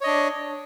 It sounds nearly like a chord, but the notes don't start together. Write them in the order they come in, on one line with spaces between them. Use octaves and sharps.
C#5 D#5 D4